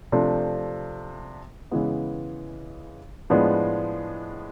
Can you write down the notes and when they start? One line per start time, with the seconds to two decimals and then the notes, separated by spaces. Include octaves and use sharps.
0.12 C3 F3 A3 D4
1.71 C#3 E3 G#3 B3
3.30 A2 F3 G#3 B3 D4